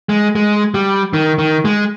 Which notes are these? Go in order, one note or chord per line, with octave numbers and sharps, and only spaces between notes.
G#3
G#3
G3
D#3
D#3
G#3